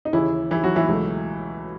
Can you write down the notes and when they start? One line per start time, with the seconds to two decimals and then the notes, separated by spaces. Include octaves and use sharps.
0.05 D#4
0.13 D#2 C#3 E3 E4
0.51 E3 E4
0.64 F#3 F#4
0.76 E3 E4
0.89 C#2 B2 F#3 A3